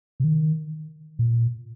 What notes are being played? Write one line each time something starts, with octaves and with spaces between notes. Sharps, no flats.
C3
D#3
A#2